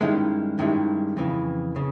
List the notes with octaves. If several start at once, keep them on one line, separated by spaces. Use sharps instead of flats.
G2 D#3 G#3 C#4 E4
G2 D#3 G#3 C#4 E4
F2 C#3 E3
C#3